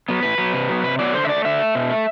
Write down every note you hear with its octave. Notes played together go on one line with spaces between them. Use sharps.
F#3 B3
A2 B4
F#3 B3
C3
F#3 B3
C3 B4
F#3 B3 D5
D3 C5
E5
A3 D5
D3 E5
A3
B2
A3